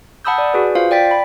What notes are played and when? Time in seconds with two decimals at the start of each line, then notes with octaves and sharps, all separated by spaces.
0.25 F#5 A5 B5 D#6 E6 G6
0.38 D5
0.54 F#4 G#4 B4
0.75 F4 C5 F5
0.91 D5 G5 A6 B6
1.11 B5